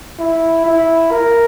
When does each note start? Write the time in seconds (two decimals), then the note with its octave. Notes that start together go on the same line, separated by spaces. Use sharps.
0.20 E4
0.66 E4
1.11 A#4